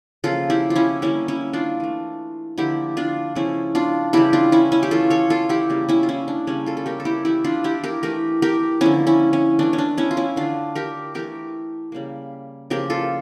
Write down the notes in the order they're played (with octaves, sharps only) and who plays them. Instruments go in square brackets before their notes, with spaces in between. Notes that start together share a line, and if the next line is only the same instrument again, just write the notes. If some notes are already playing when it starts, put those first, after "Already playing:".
[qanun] C#3 F3 A#3 F4 A4
E4 G4
F4
C#4 E4
D3 G3 A#3 C#4 E4
C#4 E4
D4 F4
E3 A3
D3 F3 A#3 E4 G4
D4 F4
C#3 F3 A3 C#4 E4
D4 F4
C#3 E3 G3 E4 G4
D4 F4
C#4 E4
C#4 E4
G4
E3 A3 F4 A4
A4 C#5
F4 A4
E4 G4
C#3 G3 A#3
C#4 E4
F4
C#4 E4
D4
C#3 G3 A#3 C#4
F4 A4
A4
G4 A#4
A4
E4 G4
E3 A3 E4 G4
D4 F4
E4 G4
G4 A#4
E3 A3 G4 A#4
G4 A#4
D3 F3 A#3 C#4 E4
C#4 E4
C#4
E3 A3 D4
C#4
D4
C#4 E4
F4
C#4 E4
D3 A3 D4 F4
G4 A#4
E3 A3 G4 A#4
C#3 G3 A#3
C#3 F3 A#3 G4 A#4
F4 A4